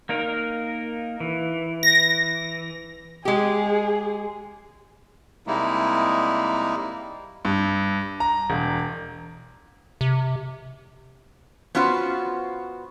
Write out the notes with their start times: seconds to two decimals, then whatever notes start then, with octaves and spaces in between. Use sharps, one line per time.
0.09 A#3 D#4 A#4
1.20 E3
1.83 A#6
3.25 G#3 G4 G#4
5.47 C3 G3 G#3 A#3 D#4 E4
7.45 G2
8.20 A#5
8.50 E1
10.01 C3
11.75 B3 C#4 F4 F#4 C5